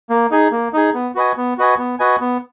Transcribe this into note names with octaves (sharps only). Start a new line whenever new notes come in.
A#3
D#4 G#4
A#3
D#4 G#4
B3
F#4 B4 D#5 G#5
B3
F#4 B4 D#5 G#5
B3
F#4 B4 D#5 G#5
B3